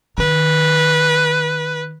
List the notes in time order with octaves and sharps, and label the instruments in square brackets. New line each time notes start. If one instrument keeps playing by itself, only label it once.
[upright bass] D#3 [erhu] B4